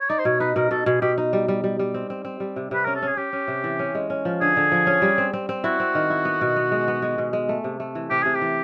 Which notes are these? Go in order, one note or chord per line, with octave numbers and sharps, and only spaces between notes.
C#5
D#4 D5
C5
B2 C#5
D#4 B4
B2 A#4
B2 A4
B2 G#4
B2 G4
D#4
G3
G3
G3
G3
C4
C4
C4
G3
C3
C3 B4
C#4 A#4
A4
C#4 G#4
C#4 G4
C#4
C3
E3
C#4
G#3
C#4
F3
D3 G#4
D3
F3
C#4
G3
C4
C4
C4
E4 F#4
C4
D#3
E4
B3
B2
B3
G#3
B3
G#3
B2
G#3
A3
C3
A3
E3
C3 G4
C3 G#4
G4
E3